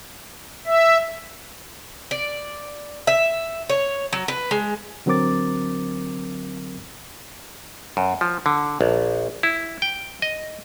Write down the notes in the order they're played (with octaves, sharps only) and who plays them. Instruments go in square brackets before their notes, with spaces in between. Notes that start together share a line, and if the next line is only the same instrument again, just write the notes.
[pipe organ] E5
[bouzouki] D5
E5
C#5
F#3
B4
G#3
[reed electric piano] D3 F#3 C4 A#4 D6 A6
[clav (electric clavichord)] F#2
F3
D3
A#1
E4
G5
D#5